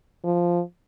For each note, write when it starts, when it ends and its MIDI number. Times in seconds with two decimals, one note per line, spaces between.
0.24 0.61 53